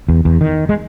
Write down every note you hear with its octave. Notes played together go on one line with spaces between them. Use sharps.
E2
E2
D#3
G#3